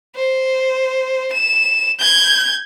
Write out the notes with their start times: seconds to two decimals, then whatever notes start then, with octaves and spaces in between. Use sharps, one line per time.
0.16 C5
1.33 E7
1.99 G6 G#6